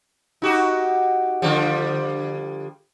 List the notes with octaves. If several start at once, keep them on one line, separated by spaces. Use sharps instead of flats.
D#4 F#4 G4
D3 F3 G3